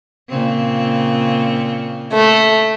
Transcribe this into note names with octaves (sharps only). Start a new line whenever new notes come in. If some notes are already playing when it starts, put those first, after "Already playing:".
A#2 C#3 C4
A3